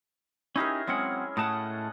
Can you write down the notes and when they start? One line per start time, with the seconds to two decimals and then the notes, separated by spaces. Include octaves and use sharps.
0.56 C#4 D#4 E4 G4 G#4 A#4
0.87 F#3 G#3 C4 C#4 F#5
1.37 A2 A3 D#5 F#5 A5